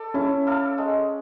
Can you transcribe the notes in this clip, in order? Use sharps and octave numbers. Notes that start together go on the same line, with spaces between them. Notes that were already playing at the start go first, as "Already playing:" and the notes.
Already playing: A4 D5
C#4 E4
A4 D5 F5
G#3